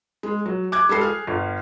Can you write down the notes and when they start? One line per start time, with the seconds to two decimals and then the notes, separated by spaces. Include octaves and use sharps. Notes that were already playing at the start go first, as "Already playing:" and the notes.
0.23 G#3
0.46 F#3
0.72 D6 F#6 G#6
0.89 G3 G#3 A4 C7
1.01 G#4 F6
1.27 G1